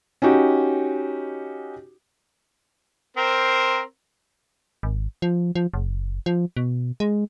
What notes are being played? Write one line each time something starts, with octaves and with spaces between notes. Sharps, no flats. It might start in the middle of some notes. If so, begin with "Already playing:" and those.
C#4 D#4 F#4 G4
C4 A#4 C5
G#1
F3
F3
F#1
F3
B2
G#3